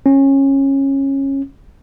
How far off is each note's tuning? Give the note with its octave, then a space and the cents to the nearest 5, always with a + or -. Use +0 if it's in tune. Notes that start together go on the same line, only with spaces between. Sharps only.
C#4 -20